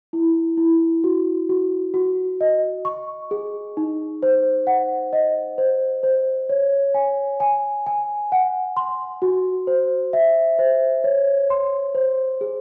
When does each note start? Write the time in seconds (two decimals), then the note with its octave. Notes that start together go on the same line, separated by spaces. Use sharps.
0.13 E4
0.57 E4
1.04 F#4
1.49 F#4
1.94 F#4
2.41 D#5
2.85 C#6
3.31 G#4
3.77 D#4
4.23 C5
4.67 F#5
5.13 D#5
5.58 C5
6.03 C5
6.49 C#5
6.94 G#5
7.40 G#5
7.86 G#5
8.32 F#5
8.77 C6
9.22 F#4
9.67 C5
10.13 E5
10.59 C5
11.04 C#5
11.50 C6
11.95 C5
12.41 G#4